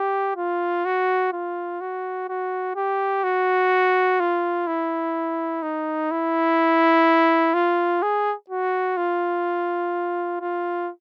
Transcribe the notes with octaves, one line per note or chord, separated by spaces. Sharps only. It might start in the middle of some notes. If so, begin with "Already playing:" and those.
Already playing: G4
F4
F#4
F4
F#4
F#4
G4
F#4
F4
E4
D#4
E4
F4
G#4
F#4
F4
F4